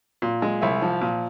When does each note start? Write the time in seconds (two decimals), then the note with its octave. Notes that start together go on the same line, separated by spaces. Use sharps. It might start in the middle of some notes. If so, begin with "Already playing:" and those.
0.22 A#2
0.42 G#3
0.62 C2 E5
0.82 F3
1.01 A#2